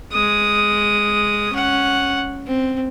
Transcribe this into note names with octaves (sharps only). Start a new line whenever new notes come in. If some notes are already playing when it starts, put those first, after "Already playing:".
G#3 D#6
C#4 F#5
C4